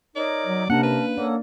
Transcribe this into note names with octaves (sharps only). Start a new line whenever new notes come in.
D#4 A#4 C#5 D5
F#3
C3 A#3 C#4 D4 A#4 F#5 A5
B4
A#3 A4 C#5 D5 F#5